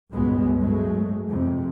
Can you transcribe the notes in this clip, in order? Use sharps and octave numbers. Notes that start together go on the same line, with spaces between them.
G1 C#2 B2 G#3 B3
G#2 F#3 G#3 A3
F2 C3